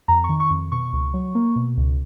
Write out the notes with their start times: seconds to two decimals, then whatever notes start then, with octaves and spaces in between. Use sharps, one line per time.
0.08 F2 A#5
0.24 C#6
0.29 D#3
0.40 C#6
0.50 F2
0.72 B2 C#6
0.93 C#2
1.14 F#3
1.35 A#3
1.56 B2
1.77 C#2